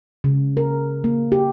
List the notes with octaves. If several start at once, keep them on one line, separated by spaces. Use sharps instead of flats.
C#3
A#4
A#3
G4